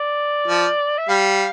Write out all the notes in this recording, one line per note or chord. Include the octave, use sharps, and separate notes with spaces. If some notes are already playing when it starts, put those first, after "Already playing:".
Already playing: D5
F3
E5
G3 F5